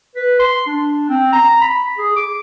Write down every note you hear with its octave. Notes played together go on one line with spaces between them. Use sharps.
B4
C6
D4
C4
A#5
B5
G#4
D6